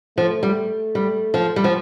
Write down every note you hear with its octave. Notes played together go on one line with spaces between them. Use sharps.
F3 A3
G3
G3
F3
G3
F3